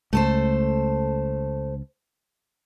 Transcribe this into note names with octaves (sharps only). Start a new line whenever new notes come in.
C#2 A3 A4 C5